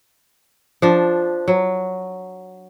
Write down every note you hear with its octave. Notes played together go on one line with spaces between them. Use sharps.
F3 D4
F#3